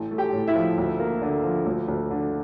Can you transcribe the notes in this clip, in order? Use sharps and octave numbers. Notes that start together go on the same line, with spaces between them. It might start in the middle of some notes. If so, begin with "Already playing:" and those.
Already playing: A1
A3
G4 G5
A2
E4 E5
F3
D2
A#3
D3
F3
D2
D2
D3